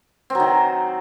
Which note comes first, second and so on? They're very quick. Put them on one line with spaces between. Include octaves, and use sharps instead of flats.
C4 F#3 D#3